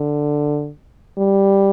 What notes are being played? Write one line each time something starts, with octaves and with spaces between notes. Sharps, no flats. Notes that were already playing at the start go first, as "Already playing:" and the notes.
Already playing: D3
G3